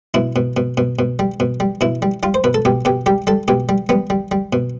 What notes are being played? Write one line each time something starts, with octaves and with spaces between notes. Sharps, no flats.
B2 E4
B2
B2
B2
B2
G3
B2
G3
B2 E4
G3
G3 F4
C5
B2 B4
A4
B2 G4
B2 G4
G3 G4
G3 A4
B2 G4
G3
G3 B3
G3
G3
B2